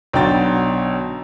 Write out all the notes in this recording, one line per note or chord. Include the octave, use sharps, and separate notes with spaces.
B1 D3 F#4 G5 A#5 A6